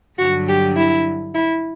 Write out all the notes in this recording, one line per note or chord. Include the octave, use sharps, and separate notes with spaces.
G2 D3 F#3 F#4
G4
E4
E4